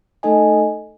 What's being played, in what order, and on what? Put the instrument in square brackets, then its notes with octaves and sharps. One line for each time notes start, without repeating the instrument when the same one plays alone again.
[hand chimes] A3 D#4 A4 D#5 G#5